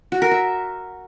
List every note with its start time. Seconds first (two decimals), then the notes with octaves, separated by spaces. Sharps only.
0.12 F#4
0.22 A#4
0.31 E5